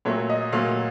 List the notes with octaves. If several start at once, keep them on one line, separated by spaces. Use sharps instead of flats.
A#2 F#3 A3 C#5
D#5
A#2 F#3 A3 F5